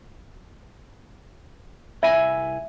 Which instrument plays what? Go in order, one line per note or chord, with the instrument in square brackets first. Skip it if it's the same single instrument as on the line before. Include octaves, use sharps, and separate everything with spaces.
[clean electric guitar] C2 E4 G#5 [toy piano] E5